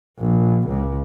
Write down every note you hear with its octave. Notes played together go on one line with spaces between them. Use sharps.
A#1
C#2